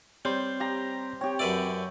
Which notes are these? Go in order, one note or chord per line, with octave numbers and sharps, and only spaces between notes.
G3 C4 C5 C#5 G6
G4 A#5
C4 G4 C#5 G5
F#2 B4 D5 E5